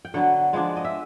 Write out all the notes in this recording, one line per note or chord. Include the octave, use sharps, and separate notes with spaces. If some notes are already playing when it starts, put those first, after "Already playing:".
G5
D3 F#3 B3 F#5
F3 G#3 B3 D4
D#5
E5